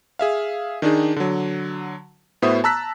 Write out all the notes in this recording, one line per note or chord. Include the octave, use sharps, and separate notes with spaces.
G#4 E5 F5
D#3 D4 D#4 G#4
D3 F#3
A2 B3 F#4 C5 E5 D#6
A5 A#5 E6 F#6 B6